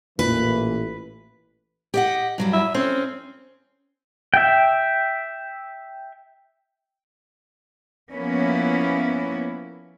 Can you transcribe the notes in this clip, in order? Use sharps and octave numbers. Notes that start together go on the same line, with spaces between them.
A1 A#2 E3 B4
G4 D#5 F#5
G2 F#3 G3
E5
C4 C#4
E5 G5
F3 A#3 B3 C#4 E4